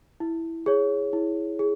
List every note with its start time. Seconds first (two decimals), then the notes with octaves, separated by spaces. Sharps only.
0.20 E4
0.66 G#4 C#5
1.13 E4
1.59 G#4